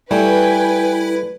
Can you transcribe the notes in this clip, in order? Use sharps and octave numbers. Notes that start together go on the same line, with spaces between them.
G3 A3 E4 B4 G5 G#5